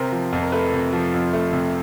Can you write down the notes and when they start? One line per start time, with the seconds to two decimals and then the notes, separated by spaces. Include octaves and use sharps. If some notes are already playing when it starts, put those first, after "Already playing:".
Already playing: C3 A#4 C5
0.12 F3
0.32 F2
0.41 A#4
0.52 A3 A4 B4
0.73 C3
0.93 F3
1.14 F2
1.33 A3
1.53 C3